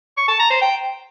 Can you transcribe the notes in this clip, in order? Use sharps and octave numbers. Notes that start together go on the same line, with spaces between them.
C#6
A5
A#5
C5
G5